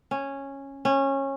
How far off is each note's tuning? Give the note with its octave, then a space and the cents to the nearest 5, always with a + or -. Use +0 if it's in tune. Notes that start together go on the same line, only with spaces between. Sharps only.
C#4 -10
C#4 -20